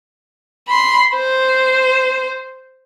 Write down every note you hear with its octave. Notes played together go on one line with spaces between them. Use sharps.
B5 C6
C5